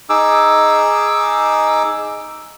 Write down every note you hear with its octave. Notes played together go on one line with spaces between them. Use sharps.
D#4 G#4 D6 E6